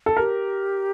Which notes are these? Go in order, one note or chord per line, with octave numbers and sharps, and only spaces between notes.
A4
G4 A#4